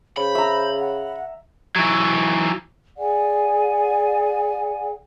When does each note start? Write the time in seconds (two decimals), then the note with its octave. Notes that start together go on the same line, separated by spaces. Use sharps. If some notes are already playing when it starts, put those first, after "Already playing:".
0.17 C#3 C5 B5
0.35 E5 A#5
0.79 F#5
1.76 E3 F#3
2.98 G#4 D5 F#5 G#5